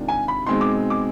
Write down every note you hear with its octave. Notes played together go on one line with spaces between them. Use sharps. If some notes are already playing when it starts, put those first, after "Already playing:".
Already playing: C3 D#3 G#3 D4 F4
G#5
B5
B2 G#3 C4 D#4 C6
D6
D6